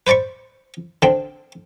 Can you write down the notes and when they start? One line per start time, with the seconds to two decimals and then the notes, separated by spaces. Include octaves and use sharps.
0.07 B4 C5 D5 B5 C#6
1.02 D3 C4